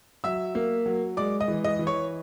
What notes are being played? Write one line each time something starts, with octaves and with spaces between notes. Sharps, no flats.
F#3 E5 E6
A#3
F#3
G#3 D5 D6
D#5 D#6
E3
D#5 D#6
E3
C#5 C#6